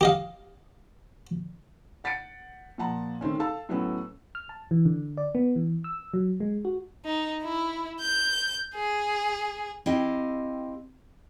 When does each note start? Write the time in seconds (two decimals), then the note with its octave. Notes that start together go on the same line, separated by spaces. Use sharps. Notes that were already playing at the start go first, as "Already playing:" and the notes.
0.01 G4 D#5 F5
2.04 F#5 A6 B6 C#7 D7
2.78 A#2 F3 F#5 A5 A#5
3.21 D#3 A3 C4 C#4
3.40 A4 F5 A5 E6
3.69 A2 F#3 A3 B3 C#4
4.35 F6
4.49 A5
4.71 E3
4.85 D3
5.17 D5
5.35 B3
5.56 E3
5.84 E6
6.14 F#3
6.40 G#3
6.65 F#4
7.05 D#4
7.42 E4
8.01 G6
8.74 G#4
9.86 C4 E4 G4 D#5 F5